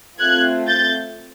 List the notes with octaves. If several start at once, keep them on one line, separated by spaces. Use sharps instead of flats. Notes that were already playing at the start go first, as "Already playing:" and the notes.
A3 C4 F4 F#6 G#6
G6 A6